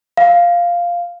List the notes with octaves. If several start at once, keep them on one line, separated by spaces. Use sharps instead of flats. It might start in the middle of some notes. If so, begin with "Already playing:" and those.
F5